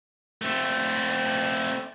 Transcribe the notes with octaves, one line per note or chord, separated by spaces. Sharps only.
A3 C4